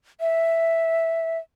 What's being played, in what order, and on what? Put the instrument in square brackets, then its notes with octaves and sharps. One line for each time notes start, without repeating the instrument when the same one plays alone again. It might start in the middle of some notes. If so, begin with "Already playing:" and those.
[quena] E5